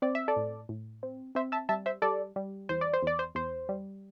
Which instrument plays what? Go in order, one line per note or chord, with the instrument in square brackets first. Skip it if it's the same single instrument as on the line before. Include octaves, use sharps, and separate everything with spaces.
[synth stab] C4 D5
E5
A4 D5
A2
A2
C4
C4 C5 E5
E5 A5
G3 E5 A5
C5 E5
G3 A4 D5
G3
E2 C5
D5
C5
E2 D5
C5
E2 C5
G3